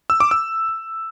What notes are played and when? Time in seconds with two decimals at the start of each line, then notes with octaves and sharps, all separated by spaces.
0.10 E6
0.20 D6
0.31 E6